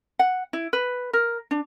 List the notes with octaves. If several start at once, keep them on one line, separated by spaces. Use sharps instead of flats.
F#5
E4
B4
A#4
D4